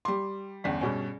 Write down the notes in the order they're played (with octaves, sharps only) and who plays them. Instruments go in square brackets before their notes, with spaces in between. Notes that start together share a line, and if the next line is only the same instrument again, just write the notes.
[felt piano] G3 C6 [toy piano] D6
[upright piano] G1 E2 [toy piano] C#4 D5 F5
[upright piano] G2 B2 C#4 [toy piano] G#4 C#5 G#5